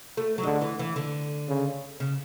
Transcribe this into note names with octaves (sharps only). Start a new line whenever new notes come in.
A3
F#3
D3 G#3
E3
E3
D3
C#3
C#3